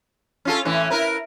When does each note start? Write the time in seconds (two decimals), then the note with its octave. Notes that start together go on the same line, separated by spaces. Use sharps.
0.45 C#4 F4 A4
0.65 A2 E3 C#4
0.90 E4 A#4 B4